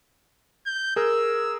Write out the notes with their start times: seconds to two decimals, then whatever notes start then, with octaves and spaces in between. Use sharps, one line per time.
0.66 G6
0.96 G#4 A#4 E6